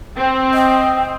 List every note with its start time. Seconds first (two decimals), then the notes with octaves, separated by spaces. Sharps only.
0.15 C4
0.54 D#5 G5